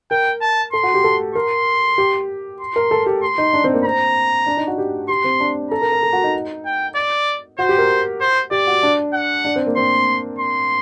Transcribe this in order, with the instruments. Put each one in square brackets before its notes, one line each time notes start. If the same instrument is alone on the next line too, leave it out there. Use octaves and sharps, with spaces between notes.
[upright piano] A#4 [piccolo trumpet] G5
[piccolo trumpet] A5
[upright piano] A4 [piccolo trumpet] C6
[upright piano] F#4
G4
A4
[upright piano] A#4 [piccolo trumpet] C6
[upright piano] G4
[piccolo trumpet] C6
[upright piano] A#4
A4
G4
[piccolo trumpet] C6
[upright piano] D#4
D4
C4
A#3
[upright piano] C4 [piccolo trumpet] A#5
[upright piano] D4
D#4
F#4
G4
[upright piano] G4 [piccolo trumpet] C6
[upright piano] C4
D4
[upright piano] A4 [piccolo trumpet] A#5
[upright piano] A#4
A#4
A4
F#4
D#4
[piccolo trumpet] G5
D5
[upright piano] F#4 [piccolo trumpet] C5
[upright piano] G4
A#4
[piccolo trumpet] C5
[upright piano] G4 [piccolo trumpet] D5
[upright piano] F#4
D4
[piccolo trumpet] F#5
[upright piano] D4
C4
A#3
[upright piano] C4 [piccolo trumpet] C6
[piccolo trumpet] C6